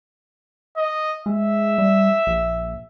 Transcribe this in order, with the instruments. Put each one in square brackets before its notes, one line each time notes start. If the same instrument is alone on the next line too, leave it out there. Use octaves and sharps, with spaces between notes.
[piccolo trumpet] D#5
[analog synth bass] G#3 [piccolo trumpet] E5
[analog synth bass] G3
A#1